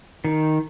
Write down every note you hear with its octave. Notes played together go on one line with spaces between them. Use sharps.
D#3